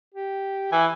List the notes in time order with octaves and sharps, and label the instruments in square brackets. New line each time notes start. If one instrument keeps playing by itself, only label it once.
[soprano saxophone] G4
[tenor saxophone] E3 [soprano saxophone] G#5